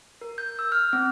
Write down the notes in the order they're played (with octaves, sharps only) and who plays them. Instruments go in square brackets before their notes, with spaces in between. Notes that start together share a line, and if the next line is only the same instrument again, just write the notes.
[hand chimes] A#4
G6
E6
F6
C4